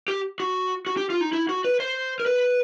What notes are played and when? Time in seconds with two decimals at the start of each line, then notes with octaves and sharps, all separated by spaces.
0.08 G4
0.40 F#4
0.87 F#4
0.97 G4
1.10 F4
1.21 D#4
1.33 E4
1.49 F#4
1.64 B4
1.80 C5
2.20 A#4
2.26 B4